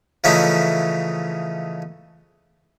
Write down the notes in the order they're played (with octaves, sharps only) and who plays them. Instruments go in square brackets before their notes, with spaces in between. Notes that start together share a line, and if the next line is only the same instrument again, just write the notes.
[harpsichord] C#3 E3 F3 A3 C#4 D#4